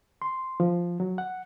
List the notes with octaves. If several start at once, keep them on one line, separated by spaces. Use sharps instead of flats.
C6
F3
F#3
F#5